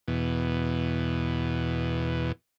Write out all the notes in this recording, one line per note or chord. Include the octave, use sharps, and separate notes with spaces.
E2 B2